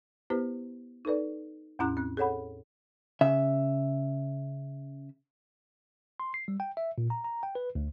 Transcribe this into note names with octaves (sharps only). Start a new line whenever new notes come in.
B3 E4 G4 B4 C5
D#4 A4 B4 D5
E2 A2 C#4 E4 A#5 F#6
C4 F#6
G#4 A4 C#5 F#5 B5
C#3 E5
C6
C7
G3
G5
E5
A#2
A#5
A#5
G5
B4
D2